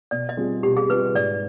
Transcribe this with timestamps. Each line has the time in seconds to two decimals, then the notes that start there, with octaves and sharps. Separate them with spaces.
0.11 B2 D5
0.29 D#5
0.37 G3 C4 F4 G#4
0.63 B2 G4
0.77 G#4
0.90 G3 C4 F4 G#4 B4
1.14 G#2 D5